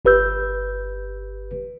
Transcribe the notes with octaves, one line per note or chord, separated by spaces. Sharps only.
G1 G4 B4 E6 G6